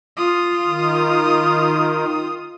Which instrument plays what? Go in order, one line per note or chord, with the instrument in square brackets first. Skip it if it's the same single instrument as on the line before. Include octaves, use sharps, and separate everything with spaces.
[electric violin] F4 D#6
[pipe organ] D#3